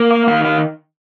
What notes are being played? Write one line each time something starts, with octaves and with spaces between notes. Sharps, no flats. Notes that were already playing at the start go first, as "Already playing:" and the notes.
Already playing: A#3
F5
D#3 F5
F5